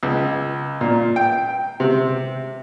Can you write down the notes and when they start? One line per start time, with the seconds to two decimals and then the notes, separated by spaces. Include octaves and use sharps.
0.03 C#2
0.81 A#2
1.16 G5
1.80 C3